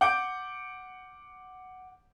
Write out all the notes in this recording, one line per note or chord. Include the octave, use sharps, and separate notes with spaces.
F#5 D6 G6 D7